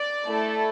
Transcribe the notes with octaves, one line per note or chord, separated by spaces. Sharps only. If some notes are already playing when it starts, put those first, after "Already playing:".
Already playing: D5
A3 E4 A4